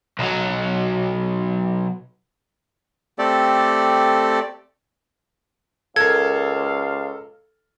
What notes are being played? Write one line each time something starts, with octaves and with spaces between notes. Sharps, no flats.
B1 F#3
A3 C4 G4 A4 D5
C#2 A4 A#4 F5 G#6